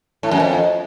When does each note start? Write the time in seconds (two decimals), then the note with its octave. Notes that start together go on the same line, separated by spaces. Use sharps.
0.23 A2
0.31 F#2
0.40 F2